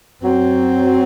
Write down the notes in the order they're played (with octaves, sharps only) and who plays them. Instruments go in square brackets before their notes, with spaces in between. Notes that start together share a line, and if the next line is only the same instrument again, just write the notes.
[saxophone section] F#2 F#3 [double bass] C4